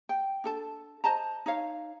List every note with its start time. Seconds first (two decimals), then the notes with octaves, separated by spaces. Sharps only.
0.09 G5
0.44 D4 A4 A5
1.04 C5 D#5 A5 A#5
1.46 D#4 C#5 F5